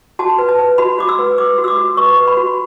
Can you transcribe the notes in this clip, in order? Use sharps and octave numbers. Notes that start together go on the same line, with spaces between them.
F#4 A5
B4
A5
B4
F#4 B5
F#4 D6
E6
B4
B4 D6
F#4
E6
D6
F#4
B4 C#6
B4
B5
F#4